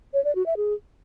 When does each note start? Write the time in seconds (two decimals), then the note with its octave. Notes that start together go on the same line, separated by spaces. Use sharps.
0.14 C#5
0.24 D5
0.35 F#4
0.46 E5
0.57 G#4